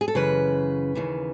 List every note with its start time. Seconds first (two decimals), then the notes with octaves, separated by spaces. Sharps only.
0.01 G#4
0.08 A4
0.15 F#2 C#3 E3 B4
0.95 D#2 C#3 E3